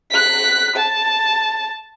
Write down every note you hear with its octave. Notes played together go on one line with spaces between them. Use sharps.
F#6 B6
A5